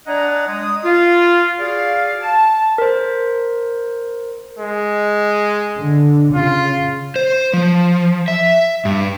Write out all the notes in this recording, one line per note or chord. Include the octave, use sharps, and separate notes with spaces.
D4 D5 D#5 F#5 G#5 A#5
G#3 D#6
F4
F#4 G#4 D5 F5
A5
A#4 C5
G#3
D3
C#3 F4
C5
F3
E5
G2